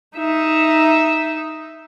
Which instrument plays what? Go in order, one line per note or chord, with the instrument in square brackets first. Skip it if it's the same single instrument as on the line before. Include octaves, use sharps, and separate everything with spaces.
[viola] D#4 E5